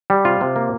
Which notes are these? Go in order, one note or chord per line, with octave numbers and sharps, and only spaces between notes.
G3
C3 F4
C3
A#3